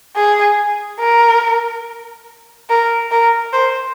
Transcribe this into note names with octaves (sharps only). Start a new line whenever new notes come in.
G#4
A#4
A#4
A#4
C5